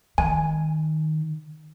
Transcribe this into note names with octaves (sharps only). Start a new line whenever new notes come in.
D#3 G#5